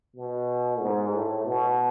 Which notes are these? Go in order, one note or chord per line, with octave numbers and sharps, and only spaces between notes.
B2
G#2
A2
B2